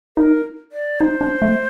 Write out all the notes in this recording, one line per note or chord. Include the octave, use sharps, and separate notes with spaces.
D#4 A#4
D5
D#4 C5
D4
A3